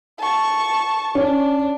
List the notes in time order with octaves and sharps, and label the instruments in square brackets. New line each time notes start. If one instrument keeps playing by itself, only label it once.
[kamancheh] A5 C#6
[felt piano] C#4 [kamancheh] D4